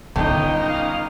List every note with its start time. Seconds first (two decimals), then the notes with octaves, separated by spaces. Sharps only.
0.16 G1 D3 C#4 D#4 D#5 G5
0.67 F5